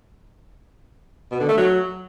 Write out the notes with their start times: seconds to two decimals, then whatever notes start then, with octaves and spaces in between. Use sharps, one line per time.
1.32 B2
1.40 D3
1.49 A3
1.58 F#3